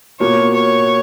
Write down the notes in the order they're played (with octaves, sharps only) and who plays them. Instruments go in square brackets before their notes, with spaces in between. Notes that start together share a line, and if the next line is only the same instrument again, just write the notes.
[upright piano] B2 A#3 F4 [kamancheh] C#5
[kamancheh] C#5